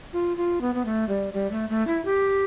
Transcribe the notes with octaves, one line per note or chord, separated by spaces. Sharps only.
F4
F4
B3
B3
A3
G3
G3
A3
A3
E4
G4